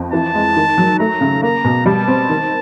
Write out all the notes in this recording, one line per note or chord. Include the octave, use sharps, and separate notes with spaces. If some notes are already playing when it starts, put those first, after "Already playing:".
Already playing: F2
E3 A5
G#3
D#3
F#3
A3 A#5
C#3
A#3 A#5
B2
G3 A5
C4
D#3